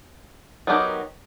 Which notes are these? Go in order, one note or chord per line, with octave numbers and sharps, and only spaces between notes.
F#3 B3 D#4 G4 A#4